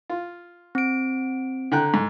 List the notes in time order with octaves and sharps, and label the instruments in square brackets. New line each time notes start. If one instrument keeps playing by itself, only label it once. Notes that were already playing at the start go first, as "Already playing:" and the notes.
[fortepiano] F4
[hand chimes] C4 D7
[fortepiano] D3 G5 F#6 [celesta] A4 A#5
[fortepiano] G#2